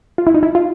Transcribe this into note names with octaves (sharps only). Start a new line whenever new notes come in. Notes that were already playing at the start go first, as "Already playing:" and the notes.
F4
E4
D#4
E4
F4